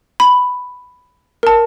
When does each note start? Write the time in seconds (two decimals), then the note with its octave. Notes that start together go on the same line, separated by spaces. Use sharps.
0.20 B5
1.43 A#4 A5